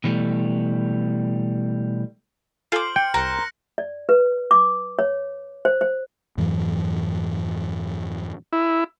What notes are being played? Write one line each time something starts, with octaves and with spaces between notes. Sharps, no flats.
B2 E3 F#3 G3 A3
F4 A4 C5 G#5 D6 F6 F#7
G5 C#7
C2 A#4 C5 F#6 A#6 C#7
D5
B4
D6
C#5
C5
C5
F2 G#2 E3 F#3
E4